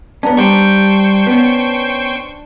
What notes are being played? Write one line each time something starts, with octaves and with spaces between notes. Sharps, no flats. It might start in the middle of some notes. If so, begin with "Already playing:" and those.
B3 C#4 D4 A#5
G3 C5 D5 G5 C#6
B3 C#4